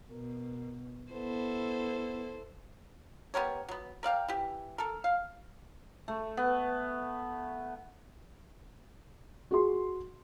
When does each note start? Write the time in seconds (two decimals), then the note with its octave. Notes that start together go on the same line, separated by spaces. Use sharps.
0.10 B2 A#4
1.12 B3 E4 A4 C5
3.34 B3 G4 A#4 C#5
3.69 F#3 B3
4.03 A#4 D5 F5 G5
4.28 E3 G4
4.78 A4 A#4
5.04 F5
6.08 A3
6.37 B3
9.51 F#4 G#4 C6